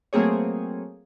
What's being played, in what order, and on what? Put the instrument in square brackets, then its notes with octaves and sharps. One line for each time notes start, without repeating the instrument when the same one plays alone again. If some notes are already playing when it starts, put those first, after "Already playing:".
[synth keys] F#3 A3 A#3 C4 G#4 C#5